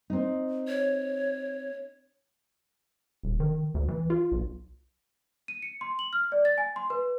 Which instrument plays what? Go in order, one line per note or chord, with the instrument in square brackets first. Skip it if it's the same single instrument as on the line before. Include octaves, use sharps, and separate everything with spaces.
[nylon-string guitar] C4 D#4
[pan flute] C#5
[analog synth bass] D#1
D#3
D2
E3
F4
B1
[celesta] D#7
C#7
C6
F#7
F6
D5
A6
G#5
C6
B4